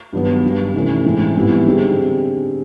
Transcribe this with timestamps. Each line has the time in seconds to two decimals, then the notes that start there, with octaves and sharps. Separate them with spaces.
0.13 G2 D#3 F#3 B3
0.44 G2 D#3 G3 A#3
0.74 C3 E3 A3 C#4
1.04 A2 E3 G#3 C4
1.35 G#2 E3 G3 B3 E4
1.66 D3 G3 C4 D#4 G#4